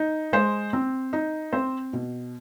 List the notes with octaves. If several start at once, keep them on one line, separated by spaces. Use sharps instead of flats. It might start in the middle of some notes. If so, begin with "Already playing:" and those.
Already playing: D#4
G#3 C5
C4
D#4
C4 C5
B2